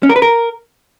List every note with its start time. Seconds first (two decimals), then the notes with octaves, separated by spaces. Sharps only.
0.03 C#4
0.09 A#4
0.16 B4
0.22 A#4